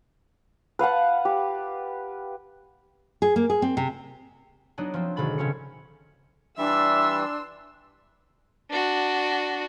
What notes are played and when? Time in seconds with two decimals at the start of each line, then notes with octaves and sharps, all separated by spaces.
0.79 B4 F5 F#5 A5
1.25 G4
3.22 G#4
3.36 A#3
3.50 G#4
3.62 C4
3.77 C3
4.78 F#3 B3 D4 D#4
4.94 F3 C4
5.16 G#1 B2 D3 B5 A6
5.38 C#3 C4 C#4 C#7
6.58 E3 G3 D4 E5 C6 E6
8.71 D4 F#4